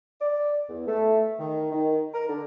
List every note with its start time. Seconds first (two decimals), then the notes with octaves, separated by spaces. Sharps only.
0.21 D5
0.70 E2
0.88 A3
1.40 D#3
1.72 D#3
2.14 A#4
2.29 D3